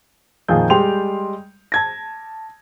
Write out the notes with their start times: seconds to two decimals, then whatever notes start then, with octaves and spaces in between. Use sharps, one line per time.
0.48 F2 A#2 D#3 F4 G#4 G6
0.70 G3 G#3 G5 C6 F7
1.72 A5 G#6 A#6